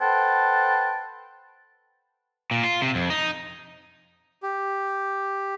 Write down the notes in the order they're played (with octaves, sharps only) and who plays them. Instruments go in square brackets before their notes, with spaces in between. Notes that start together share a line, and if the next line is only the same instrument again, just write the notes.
[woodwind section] A4 B4 C5 F#5 G5 A5
[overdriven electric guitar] A#2
F4
C3
F2
D#4
[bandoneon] G4